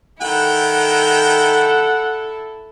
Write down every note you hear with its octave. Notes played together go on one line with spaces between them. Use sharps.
D#3 E4 A4 F#5 G5